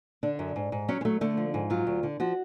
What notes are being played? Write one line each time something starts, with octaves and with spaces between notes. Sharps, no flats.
D3 D4
F#2
G#2
G#2
F#3 C#4
G#3
F#3 A3
D3 A3
F3
G#2
F#3 F4
D2
D3
F3 F#4